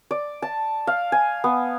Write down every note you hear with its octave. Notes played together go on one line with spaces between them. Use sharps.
D5
A5
F5
G#5
B3